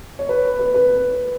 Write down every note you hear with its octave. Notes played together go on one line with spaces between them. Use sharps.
C#5
B4
B4
B4